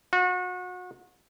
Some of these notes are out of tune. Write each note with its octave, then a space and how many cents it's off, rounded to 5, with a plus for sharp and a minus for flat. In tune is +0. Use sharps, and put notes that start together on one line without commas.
F#4 -30